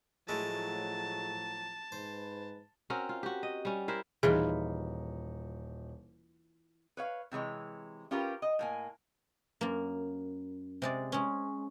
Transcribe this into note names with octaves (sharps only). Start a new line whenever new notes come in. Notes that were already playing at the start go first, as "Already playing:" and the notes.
A2 F3 F#3 G#3 A3 E4 A5
G#2 B4 C5
C4 C#4 F#4 A#4
F4
F#4 G4
D#5
G3 C#4
E4 A#4 C5 E5
D#1 E3 D#4 F4 G#4
B4 C#5 F5
C3 E3 G#3 C#5
C#4 F4 G4 A#4 B4
D#5
A2 A#3 G#5
F#2 A#3
C3 G#3 D5
G#3 C#4